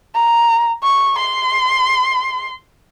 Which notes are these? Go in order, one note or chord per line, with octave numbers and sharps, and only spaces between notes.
A#5
C#6
C6